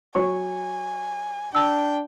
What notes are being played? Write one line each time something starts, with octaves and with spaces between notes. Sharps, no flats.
F#3 C#5 G#5 C#6
D4 G5 A5 E6